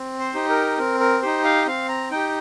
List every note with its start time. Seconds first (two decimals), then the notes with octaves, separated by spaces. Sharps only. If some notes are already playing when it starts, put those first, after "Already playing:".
Already playing: C4
0.19 C5
0.34 D#4 G4
0.49 A#4
0.78 C4 A#4
1.00 A#4
1.22 D#4 G4 C5
1.44 F5
1.66 C4 F5
1.89 A#5
2.11 D#4 G4 G5